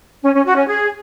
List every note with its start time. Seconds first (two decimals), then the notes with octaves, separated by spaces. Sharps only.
0.23 C#4
0.34 C#4
0.45 F#4
0.56 C#4
0.66 G#4